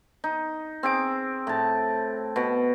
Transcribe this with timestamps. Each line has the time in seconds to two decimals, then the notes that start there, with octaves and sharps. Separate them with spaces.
0.24 D#4
0.83 C4 G#4 D6
1.47 A2 A5
2.36 B2